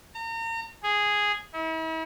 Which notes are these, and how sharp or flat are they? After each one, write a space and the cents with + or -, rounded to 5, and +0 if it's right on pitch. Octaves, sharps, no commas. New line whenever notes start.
A#5 -35
G#4 -5
E4 -40